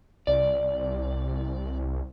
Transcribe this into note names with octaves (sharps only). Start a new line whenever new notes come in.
C2 D5